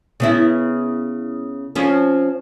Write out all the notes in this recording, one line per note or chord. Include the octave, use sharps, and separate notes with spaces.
C#3 B3 E4
F3 C4 C#4